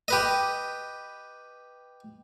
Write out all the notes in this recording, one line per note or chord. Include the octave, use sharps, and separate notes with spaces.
G4 B4 D#5